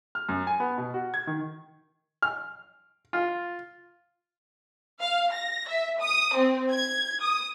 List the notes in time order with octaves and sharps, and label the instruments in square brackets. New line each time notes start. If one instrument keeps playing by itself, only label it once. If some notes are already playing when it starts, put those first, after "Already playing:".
[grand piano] F6
F#2
G#5
B3
B2
F#4
G#6
D#3
[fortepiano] F6
F4
[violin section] F5
A#6
E5
D#6
C4
G#6
D#6